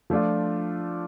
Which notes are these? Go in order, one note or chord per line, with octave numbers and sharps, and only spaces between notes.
F3 A3 D4 F4